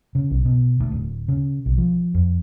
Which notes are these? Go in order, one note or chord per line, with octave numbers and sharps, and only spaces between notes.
C#3
B1
B2
D2
D1
C#3
B1
F3
F2